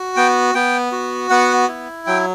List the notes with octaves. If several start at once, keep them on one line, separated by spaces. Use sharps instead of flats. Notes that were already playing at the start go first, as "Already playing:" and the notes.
Already playing: F#4
B3 G5
B3 G5
F#4
B3 F#5
E4
F#3 G5